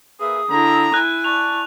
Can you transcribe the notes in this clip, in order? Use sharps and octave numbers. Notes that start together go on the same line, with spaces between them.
A#3 G#4 B4 E5 D#6
D3 E4 A#5
E4 G#5 F#6
D5 A5 C#6 F7